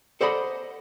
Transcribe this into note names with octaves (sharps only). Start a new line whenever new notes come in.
A4 C5 D5 D#5 F#5 B5